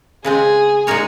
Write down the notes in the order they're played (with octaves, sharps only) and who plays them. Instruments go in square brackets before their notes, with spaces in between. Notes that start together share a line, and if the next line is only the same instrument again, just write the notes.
[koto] C#3 G#3 C4 [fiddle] G#4
[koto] A#2 G#3 D#4 A#4 C#5